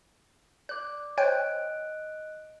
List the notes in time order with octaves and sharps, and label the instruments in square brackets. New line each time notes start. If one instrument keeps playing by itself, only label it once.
[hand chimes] D5 D6 [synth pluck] F#6
[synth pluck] C5 C#5 G5 [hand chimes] D#5 F#6 D7